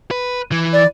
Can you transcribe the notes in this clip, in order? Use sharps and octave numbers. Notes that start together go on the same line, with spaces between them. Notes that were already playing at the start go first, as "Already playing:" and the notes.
B4
E3
D5